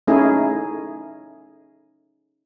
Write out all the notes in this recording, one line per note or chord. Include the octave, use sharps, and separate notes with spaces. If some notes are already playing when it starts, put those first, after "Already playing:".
A3 C#4 D#4 E4 G#4